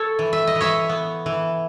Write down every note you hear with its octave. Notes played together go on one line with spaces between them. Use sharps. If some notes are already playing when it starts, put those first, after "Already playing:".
Already playing: A4 C#5
E3
E5
D#5
E3
C#5 E5
B3
E3